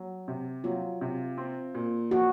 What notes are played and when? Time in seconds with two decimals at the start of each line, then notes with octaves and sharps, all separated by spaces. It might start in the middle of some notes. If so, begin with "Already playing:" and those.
Already playing: F#3
0.28 C3
0.64 F#3 F4
1.01 C3
1.38 C4
1.74 A#2
2.11 F3 F#4